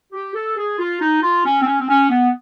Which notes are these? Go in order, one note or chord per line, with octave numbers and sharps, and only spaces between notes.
G4
A4
G#4
F4
D#4
F4
C#4
C4
C#4
C4
C#4
B3